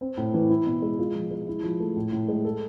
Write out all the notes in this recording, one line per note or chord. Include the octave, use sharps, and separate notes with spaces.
C4
A2
E3
E4
B2
G#3
F4
F3
G#3
E4
F3
A3
A2
A2
G#3
A4